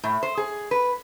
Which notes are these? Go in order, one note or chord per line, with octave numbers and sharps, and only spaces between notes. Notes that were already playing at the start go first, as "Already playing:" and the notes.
A2
C5
G#4
B4